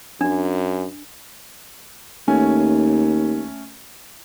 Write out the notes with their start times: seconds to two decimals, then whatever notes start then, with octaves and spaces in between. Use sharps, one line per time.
0.21 F#2 D4
2.28 D#2 A3 C#4 G#5